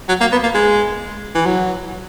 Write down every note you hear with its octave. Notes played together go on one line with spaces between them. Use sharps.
F#3
A#3
B3
A#3
G#3
E3
F#3